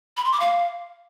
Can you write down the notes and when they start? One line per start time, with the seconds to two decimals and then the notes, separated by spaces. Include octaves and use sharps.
0.17 B5
0.25 C6
0.32 D6
0.40 F5